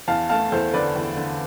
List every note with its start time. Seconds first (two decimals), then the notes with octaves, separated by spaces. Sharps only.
0.08 E2 F5 A5
0.29 A3 F5 A5
0.52 E2 A4 C5
0.74 D3 B4 D5
0.96 E2
1.17 D3